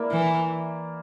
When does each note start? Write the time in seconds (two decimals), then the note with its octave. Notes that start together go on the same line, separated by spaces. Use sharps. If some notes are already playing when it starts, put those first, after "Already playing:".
Already playing: A#3 E4 A#4 D5
0.11 E3